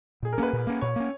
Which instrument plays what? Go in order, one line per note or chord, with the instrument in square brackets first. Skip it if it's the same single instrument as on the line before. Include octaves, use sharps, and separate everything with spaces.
[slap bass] A#2 [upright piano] G#4
[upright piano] A#4
[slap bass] A#3 C#4 [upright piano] B4
[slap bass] A#2
A#3 C#4
[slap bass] A#2 [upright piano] C#5
[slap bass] A#3 C#4